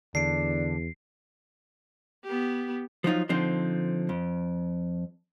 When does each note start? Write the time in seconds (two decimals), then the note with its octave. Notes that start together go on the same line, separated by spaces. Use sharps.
0.15 E2 D3 D4 C7 D7
2.24 B3 G4
3.04 F3 F#3 D#4 F4
3.29 D3 F3 C4 D#4 C5
4.09 F2